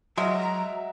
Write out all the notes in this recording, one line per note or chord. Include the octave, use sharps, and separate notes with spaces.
F#3 G#3 E5 F#5 A#5